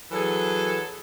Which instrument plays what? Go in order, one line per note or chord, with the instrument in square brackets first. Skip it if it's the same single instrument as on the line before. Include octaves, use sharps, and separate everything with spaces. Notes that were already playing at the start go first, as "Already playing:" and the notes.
[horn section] E3 F#3 G#4 A4